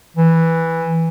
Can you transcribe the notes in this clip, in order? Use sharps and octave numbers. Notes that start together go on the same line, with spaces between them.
E3